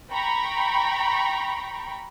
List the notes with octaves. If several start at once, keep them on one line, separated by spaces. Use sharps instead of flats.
G5 A#5 B5 C#6